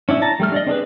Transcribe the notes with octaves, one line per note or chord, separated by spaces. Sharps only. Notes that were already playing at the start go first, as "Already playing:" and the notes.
C#4 D4 E4
A5 A#5
G3 A3 F6
D4 D5 D#5
C4 D4 G#4 B4